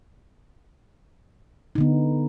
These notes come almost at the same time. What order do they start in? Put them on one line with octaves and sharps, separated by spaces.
D#4 D3 B3